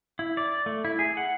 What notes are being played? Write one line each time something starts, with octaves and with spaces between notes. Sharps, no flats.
E4
D5
A3
E4
G#4
F#5